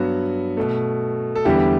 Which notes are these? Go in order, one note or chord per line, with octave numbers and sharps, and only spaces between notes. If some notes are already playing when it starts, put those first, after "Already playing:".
Already playing: G2 F#3 B3 F#4
B2 A3
A4
E2 D3 G3 B3 E4 G4